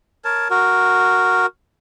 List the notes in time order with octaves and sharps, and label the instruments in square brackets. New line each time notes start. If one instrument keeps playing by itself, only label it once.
[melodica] A#4 C#5 A5
F#4 A#4